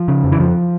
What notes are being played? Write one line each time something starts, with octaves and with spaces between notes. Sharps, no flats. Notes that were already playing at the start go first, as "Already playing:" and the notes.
Already playing: F3
C#3
F2
E3
F2 F3